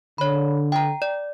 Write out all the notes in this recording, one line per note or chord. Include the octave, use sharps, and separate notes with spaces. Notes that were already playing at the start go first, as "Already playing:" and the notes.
D3 C#5 B5
G5 A#5
D5